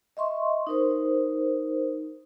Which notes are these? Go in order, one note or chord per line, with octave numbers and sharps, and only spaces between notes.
D#5 E5 C6 C#6
D#4 A#4 C5